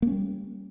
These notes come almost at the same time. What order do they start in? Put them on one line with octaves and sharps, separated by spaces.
A#3 C#4 G3